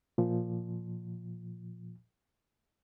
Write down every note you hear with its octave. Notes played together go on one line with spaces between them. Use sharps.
A#2 F3